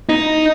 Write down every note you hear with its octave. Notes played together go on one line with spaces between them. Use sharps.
D#4